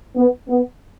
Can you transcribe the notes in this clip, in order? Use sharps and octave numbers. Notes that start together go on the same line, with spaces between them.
B3
B3